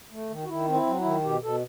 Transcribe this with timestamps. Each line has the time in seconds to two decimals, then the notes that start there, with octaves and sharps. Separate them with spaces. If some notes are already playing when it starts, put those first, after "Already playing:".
0.11 A3
0.30 D#3
0.44 F#4
0.48 D#3 E4
0.68 C4
0.74 E4
0.86 F#3
0.99 E4
1.05 D#3
1.24 B2 G4
1.42 B2 A4